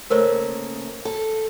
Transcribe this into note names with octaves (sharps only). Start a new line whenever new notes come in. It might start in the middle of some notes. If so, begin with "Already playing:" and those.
C#3 A3 A#3 A#4 C5 C#5
A4